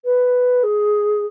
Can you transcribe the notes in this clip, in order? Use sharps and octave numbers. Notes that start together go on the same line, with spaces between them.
B4
G#4